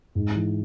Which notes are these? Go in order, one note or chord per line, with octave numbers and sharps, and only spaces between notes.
G#2
E3